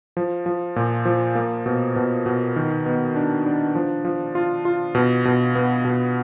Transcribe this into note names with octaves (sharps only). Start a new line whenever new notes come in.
F3
F3
A#2
F3
A#3
B2
B2
B2
D#3
B3
D4
D4
F3
F3
F4
F4
B2
B2
B3
B2